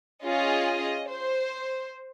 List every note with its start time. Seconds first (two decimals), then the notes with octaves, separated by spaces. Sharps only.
0.23 C#4 F4 G#4 D#5
1.09 C5